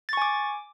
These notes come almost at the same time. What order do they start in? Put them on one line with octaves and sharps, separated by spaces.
A6 C#6 G#5 D6